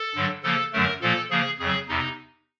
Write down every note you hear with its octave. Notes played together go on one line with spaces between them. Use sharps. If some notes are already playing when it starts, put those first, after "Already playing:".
Already playing: A4
G2 D3 F#3
C#3 F3 A#3 A4
F#2 D3 F#3 A3 A#4
A#2 F3 A#3 A4
C#3 F3 A#3 G#4
F2 C#3 F#3 G#4
E2 C3 D#4